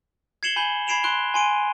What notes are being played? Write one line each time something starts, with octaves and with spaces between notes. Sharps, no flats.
G#6 C7 C#7 E7 F#7 G7
G#5 B5 G6 F#7 G7
B5 G#6 C7 D7 E7 F7
C6 F#6 D7 G7
G#5 C6 D7 D#7